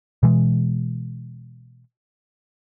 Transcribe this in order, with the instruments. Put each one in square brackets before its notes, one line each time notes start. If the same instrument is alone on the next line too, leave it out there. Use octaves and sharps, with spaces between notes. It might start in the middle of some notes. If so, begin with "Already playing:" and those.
[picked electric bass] B2 E3 G#3